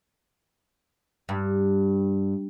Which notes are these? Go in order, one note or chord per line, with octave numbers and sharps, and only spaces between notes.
G2